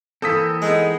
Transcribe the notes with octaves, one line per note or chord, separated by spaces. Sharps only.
E3 A#3 C4 A4 D#6 B6
G#3 B3 D#4 D#5